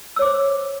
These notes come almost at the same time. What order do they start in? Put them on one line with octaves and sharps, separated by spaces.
E6 C#5 D6 C5